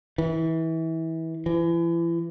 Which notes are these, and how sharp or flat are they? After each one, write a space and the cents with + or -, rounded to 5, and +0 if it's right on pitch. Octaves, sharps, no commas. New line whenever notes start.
E3 -25
E3 +35